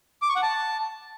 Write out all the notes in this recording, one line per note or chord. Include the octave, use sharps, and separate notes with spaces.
D6
C#6
F#5
A5